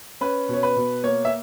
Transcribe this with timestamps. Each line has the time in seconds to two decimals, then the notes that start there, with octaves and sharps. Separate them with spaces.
0.21 C#4 B4
0.49 B2 C#5
0.63 B4
0.77 B2
1.03 A#3 C#5
1.25 E5